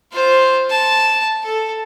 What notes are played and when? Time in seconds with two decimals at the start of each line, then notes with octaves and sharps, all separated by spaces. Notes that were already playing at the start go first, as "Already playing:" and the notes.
0.13 F4 C5
0.70 A5
1.43 A4